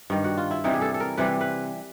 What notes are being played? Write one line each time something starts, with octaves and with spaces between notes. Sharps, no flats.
G2 D#3 G3
F#4
F4
E4
C3 E3 G3 D#4
G#4
A4
A4
A#4
C3 E3 G3 B4
B4